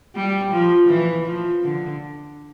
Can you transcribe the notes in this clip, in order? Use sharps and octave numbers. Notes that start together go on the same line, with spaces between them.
G3
F3
E3
F3
D3